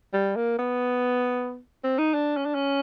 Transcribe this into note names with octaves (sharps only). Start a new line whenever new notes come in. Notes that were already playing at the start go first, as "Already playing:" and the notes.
G3
A#3
B3
C4
D#4
D4
C#4
D4
C#4